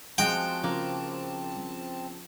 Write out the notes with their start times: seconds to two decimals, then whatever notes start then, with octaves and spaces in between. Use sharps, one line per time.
0.18 F3 G#3 C4 F#4 G5 A5
0.64 C#3 F3 A#3